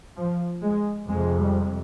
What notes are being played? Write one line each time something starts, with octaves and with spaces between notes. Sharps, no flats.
F3
G#3
F2 C3 G#3
G3